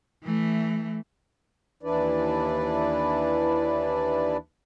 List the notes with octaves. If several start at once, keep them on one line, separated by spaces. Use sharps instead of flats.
E3 A3
D#2 E3 D4 E4 B4 D5